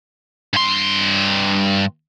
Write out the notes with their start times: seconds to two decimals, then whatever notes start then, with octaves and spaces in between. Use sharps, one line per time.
0.54 G2 C6